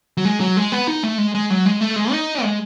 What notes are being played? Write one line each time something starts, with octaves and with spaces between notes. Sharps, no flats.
F#3
G#3
F#3
G#3
B3
D#4
A3
G#3
G#3
F#3
G#3
A3
G#3
D#4
G#3